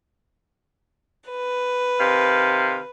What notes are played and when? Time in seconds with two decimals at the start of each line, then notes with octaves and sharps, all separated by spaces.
1.29 B4
2.00 C3 D#3 F5